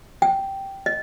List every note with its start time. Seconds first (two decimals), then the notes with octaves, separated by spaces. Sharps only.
0.22 G5
0.86 D#5